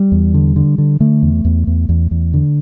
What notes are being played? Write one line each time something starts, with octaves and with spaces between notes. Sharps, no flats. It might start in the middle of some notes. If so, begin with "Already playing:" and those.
Already playing: G3
E2
D3
D3
D3
D3 A3
E2
E2
E2
E2
E2
D3